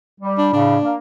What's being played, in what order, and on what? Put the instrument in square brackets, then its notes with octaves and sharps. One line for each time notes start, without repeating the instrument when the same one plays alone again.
[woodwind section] G3
[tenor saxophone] D4
[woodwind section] A2 C#3 [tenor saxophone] D4
[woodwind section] A#3